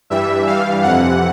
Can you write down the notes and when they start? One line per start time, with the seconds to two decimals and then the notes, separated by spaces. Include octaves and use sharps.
0.10 G2 E3 G3 E5
0.46 G2 E3 G3 F5
0.83 F2 C3 E3 F#5